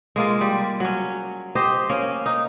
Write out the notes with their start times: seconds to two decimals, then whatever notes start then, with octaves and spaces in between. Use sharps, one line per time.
0.16 G#3 A#3 F4
0.41 G3
0.80 F#3 C#4
1.55 G4 C5 D#5
1.89 A#3 C#4
2.26 D#4